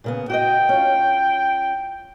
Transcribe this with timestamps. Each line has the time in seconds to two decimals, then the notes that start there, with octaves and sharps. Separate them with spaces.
0.04 A#2 C#3 B3
0.30 F#4 C#5 D#5 G5
0.69 C#4 F4